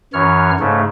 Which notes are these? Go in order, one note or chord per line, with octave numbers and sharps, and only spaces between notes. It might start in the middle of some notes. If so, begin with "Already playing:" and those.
F#2 E3 C#5 F6
G#2 C#3 A3